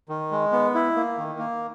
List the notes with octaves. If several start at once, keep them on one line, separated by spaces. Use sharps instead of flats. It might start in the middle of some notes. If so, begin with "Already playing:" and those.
D#3
G#3
B3
E4
A#3
D#3
A#3